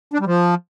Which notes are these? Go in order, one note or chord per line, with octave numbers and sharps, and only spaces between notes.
D4
G3
F3